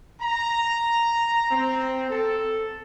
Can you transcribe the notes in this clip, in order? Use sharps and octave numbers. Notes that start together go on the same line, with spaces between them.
A#5
C4
A4